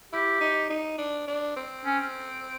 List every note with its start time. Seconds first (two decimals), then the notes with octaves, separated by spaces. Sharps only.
0.13 E4 G4
0.40 D#4
0.70 D#4
0.98 D4
1.28 D4
1.57 C4
1.85 C#4